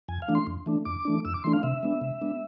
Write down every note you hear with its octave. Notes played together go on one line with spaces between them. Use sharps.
F2 G#5
F5
E3 A3 D4
C6
F2
E3 A3 D4
F2 D6
E3 A3 D4
F2 E6
D6
E3 A3 D4 C6
F5
C3 E5
G#3 B3 D4
C3
G#3 B3 D4